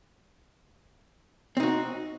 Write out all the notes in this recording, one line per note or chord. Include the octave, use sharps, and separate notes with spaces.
C4 D#4 F#4